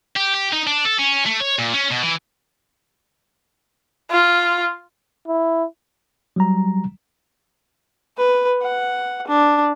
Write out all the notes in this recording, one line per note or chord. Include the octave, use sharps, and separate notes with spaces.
G4
G4
D#4
D4
A4
C#4
A3
C#5
A#2
C#4
B2
E3
F4
E4
F#3 G3 A#5
B4
F#5
D4